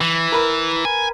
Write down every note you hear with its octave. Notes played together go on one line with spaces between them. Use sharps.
E3
A#4 B4
G#5